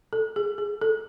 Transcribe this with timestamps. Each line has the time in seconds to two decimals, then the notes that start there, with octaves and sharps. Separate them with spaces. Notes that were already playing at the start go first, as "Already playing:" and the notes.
0.13 A4
0.36 G#4
0.58 G#4
0.81 A4